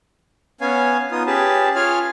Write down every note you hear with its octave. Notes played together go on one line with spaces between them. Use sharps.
B3 C#4 C#5 F5 G#5
B3 D#4 F4 D#6
C#4 G4 G#4 B4 A5
F4 G#4 C#5 F5 G#5 F6